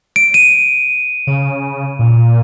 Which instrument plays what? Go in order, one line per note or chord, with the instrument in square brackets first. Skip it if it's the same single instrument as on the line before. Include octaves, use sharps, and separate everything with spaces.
[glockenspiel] D7
D#7
[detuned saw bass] C#3
A#2